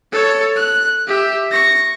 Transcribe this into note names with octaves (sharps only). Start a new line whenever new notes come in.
A4 C#5
F#6
G4 E5
C#6 A#6